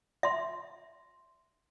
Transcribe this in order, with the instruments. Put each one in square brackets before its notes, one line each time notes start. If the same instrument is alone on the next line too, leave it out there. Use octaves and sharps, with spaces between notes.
[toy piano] E5 C6